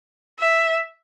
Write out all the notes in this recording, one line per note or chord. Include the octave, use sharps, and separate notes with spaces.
E5